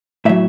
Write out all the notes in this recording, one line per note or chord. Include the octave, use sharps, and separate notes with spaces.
A2 F#3 E5